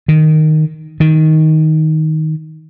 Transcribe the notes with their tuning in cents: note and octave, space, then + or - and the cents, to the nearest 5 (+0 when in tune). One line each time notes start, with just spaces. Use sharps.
D#3 -5
D#3 +10